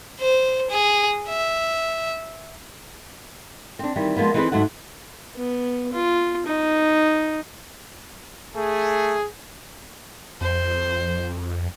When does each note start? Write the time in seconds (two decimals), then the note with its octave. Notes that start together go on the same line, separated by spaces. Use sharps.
0.20 C5
0.70 G#4
1.29 E5
3.79 C4 D4
3.96 D#3 E3 G3 C4
4.17 F3 G#3 A#3 B3
4.34 E3 C4 D#4 F#4 G#4 B4
4.52 D2 G#2 F#3 A3 F#5
5.36 B3
5.93 F4
6.46 D#4
8.56 A3 G#4
10.41 F2 C5